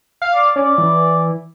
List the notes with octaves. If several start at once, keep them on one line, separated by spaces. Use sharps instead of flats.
F5
D5
C#4 D5
E3